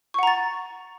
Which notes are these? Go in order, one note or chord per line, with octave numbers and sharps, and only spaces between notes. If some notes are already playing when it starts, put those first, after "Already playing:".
F#5 A#5 C#6 A6